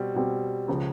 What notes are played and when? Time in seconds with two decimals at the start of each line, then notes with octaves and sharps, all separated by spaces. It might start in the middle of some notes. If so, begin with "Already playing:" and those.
Already playing: B2 G3 C4
0.14 B2 G3 C4
0.68 C#2 C#3 F3